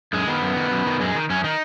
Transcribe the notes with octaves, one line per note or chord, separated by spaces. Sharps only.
F#2 G#3
D#3 B3
F#2
D#3
F#2
D#3
F#2 G#3
D#3
F#2 C#4
D#3 D#4